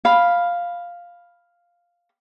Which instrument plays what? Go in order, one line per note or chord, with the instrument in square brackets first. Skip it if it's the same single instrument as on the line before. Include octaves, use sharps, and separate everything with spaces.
[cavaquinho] F5 B5